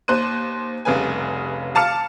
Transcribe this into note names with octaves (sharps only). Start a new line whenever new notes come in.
D#2 C5 F#6 D#7
F1 C2 C#3 B4 G#5
F5 A5 D6 F6 C#7